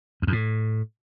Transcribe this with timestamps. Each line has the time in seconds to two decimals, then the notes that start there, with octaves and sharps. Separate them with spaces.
0.22 E2
0.27 F2
0.32 A2